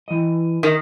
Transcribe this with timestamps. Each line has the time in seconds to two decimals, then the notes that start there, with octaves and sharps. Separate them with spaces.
0.08 E3 D#5
0.63 D#3